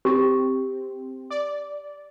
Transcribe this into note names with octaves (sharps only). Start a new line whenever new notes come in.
C4 G4
D5